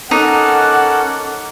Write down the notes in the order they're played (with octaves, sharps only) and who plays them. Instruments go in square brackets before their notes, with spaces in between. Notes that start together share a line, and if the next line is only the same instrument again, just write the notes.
[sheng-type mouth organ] C#4 A4 A#4 [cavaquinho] D#4 [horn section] F#5 [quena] D6